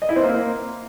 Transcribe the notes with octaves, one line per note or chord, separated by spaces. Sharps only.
D#5
E4
C4
A#3